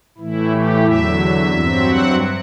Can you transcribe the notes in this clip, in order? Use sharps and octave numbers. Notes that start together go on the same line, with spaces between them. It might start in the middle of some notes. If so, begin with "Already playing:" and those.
A2 E3 A3 E4
G4
E2 D3 F#3 E5
G2 F#3 C4
F#5